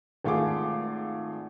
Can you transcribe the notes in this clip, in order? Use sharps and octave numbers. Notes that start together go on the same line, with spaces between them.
G#1 A3 F4 G#4 D6